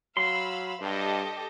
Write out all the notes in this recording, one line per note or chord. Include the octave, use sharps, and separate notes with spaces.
F#3 F5 B5 C6 E6
G2 G4 A4 D#5